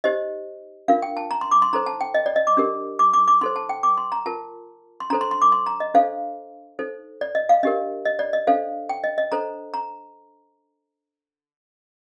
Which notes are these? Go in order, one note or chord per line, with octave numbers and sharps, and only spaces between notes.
D#4 G4 C5 D#5
D4 F4 A#4 F5
G5
A5
A#5
C6
D6
C6
D#4 A4 C5 A#5
A5
G5
D#5
D5
D#5
D6
D4 G4 A#4
D6
D6
D6
D#4 A4 C5 C6
A5
G5
D6
C6
A#5
F4 A#4 A5
C6
D4 A4 C5 A#5
C6
C6
D6
C6
A#5
D#5
D4 A4 C5 F5
D#4 A4 C5
D5
D#5
F5
D4 G4 A#4 D#5
D#5
D5
D#5
D4 A4 C5 F5
G5
D#5
D#5
D4 A4 C5 A#5
A#5